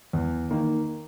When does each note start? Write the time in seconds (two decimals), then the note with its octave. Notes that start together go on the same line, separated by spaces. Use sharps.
0.13 E2
0.51 D#3 A#3